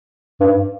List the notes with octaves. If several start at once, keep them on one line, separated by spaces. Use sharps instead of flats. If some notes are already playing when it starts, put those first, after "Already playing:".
G2